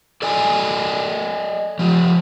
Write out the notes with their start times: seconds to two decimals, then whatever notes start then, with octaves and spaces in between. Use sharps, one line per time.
0.22 A4 D5 D#5 G#5
1.79 F3 G4